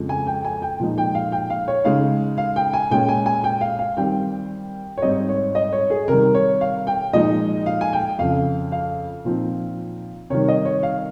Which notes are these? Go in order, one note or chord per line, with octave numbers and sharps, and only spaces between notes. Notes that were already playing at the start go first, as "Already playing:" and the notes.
Already playing: F2 C#3 F3 G#3
G#5
G5
G#5
G5
A#2 F3 G#3 D#4
G5
F5
G5
F5
C#5
C#3 G#3 D#4 F5
F5
G5
G#5
A#2 G#3 C#4 G5
G#5
G#5
G5
F5
F5
D#3 G3 C4 G5
C#5
G#2 G3 C4 D#4 D#5
C#5
D#5
C#5
G#4
C3 D#3 G3 A#4
C#5
F5
G5
A#2 F3 G#3 D#4 D#5
F5
G#5
G5
F2 C#3 F3 F5
F5
A#2 F3 C4 D#4
C3 D#3 G3 C#5
D#5
C#5
F5